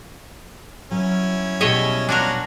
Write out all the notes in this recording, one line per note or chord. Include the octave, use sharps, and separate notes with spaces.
F#3 C#4 E4
B2 G3 G#4 C#5 D#5 E5
C#4 D4 F4 F#4 A#4 D6